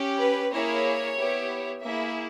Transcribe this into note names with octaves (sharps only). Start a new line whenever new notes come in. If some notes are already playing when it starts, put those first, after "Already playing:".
Already playing: C#4 G4
B4
A#3 E4 G#4 C#5
B3 E4 G4
A#3 E4 G#4 E5